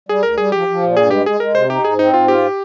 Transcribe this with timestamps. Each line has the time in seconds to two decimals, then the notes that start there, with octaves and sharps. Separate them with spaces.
0.09 G3 G#4
0.23 D2 A#4
0.37 G3 G#4
0.52 F3 G4
0.68 F3
0.82 A#2
0.97 G2 G#4
1.11 G#3 G4
1.26 G#3 G#4
1.40 G#3 A#4
1.54 C3 C5
1.70 D#4 G4
1.84 G#2 G#4
1.99 C4 D#4
2.13 G#2 F4
2.28 F4 G4